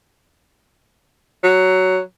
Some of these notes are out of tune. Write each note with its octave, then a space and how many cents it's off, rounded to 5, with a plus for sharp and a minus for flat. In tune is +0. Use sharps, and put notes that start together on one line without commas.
F#3 +10